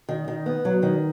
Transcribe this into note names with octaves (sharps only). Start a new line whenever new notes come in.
D#3
D#3
B3
F#3
D#3